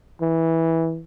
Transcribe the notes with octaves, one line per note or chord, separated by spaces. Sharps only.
E3